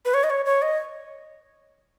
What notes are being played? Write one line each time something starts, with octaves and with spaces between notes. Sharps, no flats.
B4
C#5
D#5
C#5
C#5
D#5